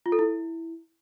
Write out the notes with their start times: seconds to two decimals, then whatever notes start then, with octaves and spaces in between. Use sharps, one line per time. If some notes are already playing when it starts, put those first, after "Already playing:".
0.06 F4
0.12 A4
0.19 E4